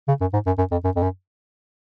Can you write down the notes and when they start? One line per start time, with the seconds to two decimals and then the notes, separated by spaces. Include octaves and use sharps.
0.08 C#3
0.21 F#2
0.33 G#2
0.46 F#2
0.58 F#2
0.72 F2
0.84 F#2
0.96 F2
1.02 F#2